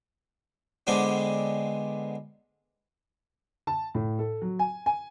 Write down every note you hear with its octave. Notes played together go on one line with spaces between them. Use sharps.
D3 G#3 B3 C4 D4
A5
A2
A4
F#3
G#5
G#5